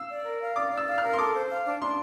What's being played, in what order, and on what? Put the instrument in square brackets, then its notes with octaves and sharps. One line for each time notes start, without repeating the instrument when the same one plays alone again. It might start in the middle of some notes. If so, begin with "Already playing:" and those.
Already playing: [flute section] F5 [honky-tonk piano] E6
[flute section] D5
A#4
F5
[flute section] D5 [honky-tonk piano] D6
[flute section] D5
[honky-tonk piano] E6
[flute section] F5
[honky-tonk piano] F6
[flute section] A#4
[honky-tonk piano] C6
[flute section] A4 [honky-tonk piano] D6
[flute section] C5
F5
D4
[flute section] D4 [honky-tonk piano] C6